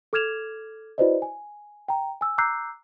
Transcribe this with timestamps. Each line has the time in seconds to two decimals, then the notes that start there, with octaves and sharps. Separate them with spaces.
0.13 A4 D6 F6 G#6 E7 F7
0.98 E4 F#4 B4 C5 D5 D#5
1.22 G#5
1.88 G5 A#5
2.21 G#5 E6
2.38 A#5 D6 E6 F#6 G6 C7